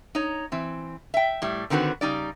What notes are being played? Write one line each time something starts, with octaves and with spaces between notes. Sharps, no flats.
D#4 C#5
E3 C4
E5 G5
A2 G3
D3 D#3 C4 F#4 B4
C#3 G3 D#4 D5